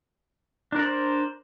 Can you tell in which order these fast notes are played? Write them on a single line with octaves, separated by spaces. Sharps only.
D4 A#4 D5 C5